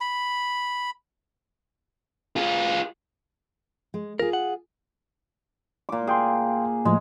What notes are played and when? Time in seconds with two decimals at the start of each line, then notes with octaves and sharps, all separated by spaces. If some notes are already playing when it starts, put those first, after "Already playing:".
0.01 B5
2.36 F4 G#4
3.94 G#3
4.19 F4 G#4 A#4
4.33 F#5
5.89 A#2 D6
6.07 G#4 F5 G5 C6
6.85 A2 F3 G#3 A3